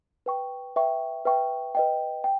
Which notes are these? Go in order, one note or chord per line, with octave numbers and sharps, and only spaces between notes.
B4 G5 C#6
B4 E5 G5 C#6
B4 E5 G5 C#6
B4 D#5 G5
G5